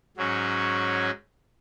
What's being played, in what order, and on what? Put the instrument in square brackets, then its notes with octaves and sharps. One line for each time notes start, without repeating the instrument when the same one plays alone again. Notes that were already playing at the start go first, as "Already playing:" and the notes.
[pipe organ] G#2 F#3 C#4 F#4